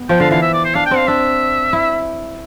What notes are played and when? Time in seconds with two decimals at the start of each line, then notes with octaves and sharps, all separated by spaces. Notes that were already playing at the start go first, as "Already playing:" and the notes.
Already playing: B3
0.09 F3 G5
0.20 D3 F5
0.31 E3 F5
0.42 E5
0.53 D5
0.64 C5
0.74 D4 F5
0.86 G5
0.91 C4
0.97 F5
1.08 D4 E5
1.73 E4